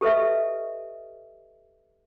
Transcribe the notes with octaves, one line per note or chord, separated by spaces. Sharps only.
G4 A4 B4 D#5 E5